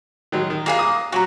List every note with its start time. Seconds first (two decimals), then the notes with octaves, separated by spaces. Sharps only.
0.32 D#3 F#3 G#3
0.50 D#3
0.66 A#3 F4 G#4 F5 G5 F#6
0.79 D#6
1.12 F#3 C#4 F#4 A#5